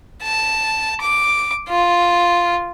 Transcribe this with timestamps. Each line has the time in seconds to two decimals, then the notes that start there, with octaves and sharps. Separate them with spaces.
0.22 A5
1.01 D6
1.69 F4